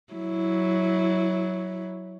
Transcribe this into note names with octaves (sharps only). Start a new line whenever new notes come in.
F#3 E4